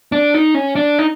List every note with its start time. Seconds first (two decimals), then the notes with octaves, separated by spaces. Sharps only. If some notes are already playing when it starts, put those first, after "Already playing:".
0.12 D4
0.34 D#4
0.54 C#4
0.76 D4
0.99 D#4